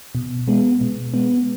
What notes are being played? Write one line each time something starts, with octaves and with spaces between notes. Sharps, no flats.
B2
G#3 B3
B2
G#3 B3